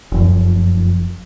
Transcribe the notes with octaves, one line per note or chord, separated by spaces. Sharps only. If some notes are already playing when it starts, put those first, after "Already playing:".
F1 F#2 F3